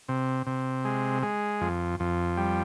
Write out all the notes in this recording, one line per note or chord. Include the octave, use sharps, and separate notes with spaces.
C3
C3
G#3
G#3
F2
F2
G3